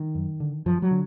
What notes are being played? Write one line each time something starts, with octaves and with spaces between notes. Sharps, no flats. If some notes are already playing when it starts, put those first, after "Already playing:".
Already playing: D#3
F#2
D3
F#2 F3
F#3
D3